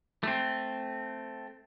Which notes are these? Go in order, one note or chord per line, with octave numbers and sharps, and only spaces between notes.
A3 C4